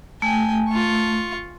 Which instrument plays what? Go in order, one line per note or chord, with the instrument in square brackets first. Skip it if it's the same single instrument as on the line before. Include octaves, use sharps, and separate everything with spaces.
[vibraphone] A3 [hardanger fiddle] G5 G#5
[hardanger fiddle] F4 C#6